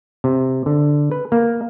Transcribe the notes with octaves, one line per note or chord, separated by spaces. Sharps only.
C3
D3
B4
A#3